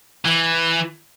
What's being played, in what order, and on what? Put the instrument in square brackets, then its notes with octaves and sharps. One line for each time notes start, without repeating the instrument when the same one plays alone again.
[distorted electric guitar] E3